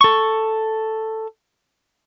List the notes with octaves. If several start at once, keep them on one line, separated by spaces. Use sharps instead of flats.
A4 C#6